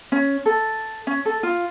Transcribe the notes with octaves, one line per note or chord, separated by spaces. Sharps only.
C#4
A4
C#4
A4
F4